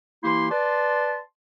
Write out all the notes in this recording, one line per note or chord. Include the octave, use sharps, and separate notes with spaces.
E3 A#3 E4 G4 C6
B4 D5 A5 C6